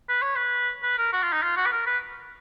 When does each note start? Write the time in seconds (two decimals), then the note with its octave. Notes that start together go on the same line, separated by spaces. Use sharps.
0.09 B4
0.22 C#5
0.36 B4
0.83 B4
0.98 A#4
1.13 F#4
1.22 F4
1.32 D#4
1.42 F4
1.57 F#4
1.66 B4
1.72 A#4
1.86 B4